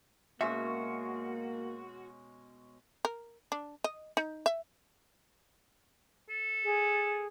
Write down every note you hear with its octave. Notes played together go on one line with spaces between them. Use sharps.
B2 G#3 A#3 C#4 F#4 E5
A#4
D4
D#5
D#4
E5
A4
G#4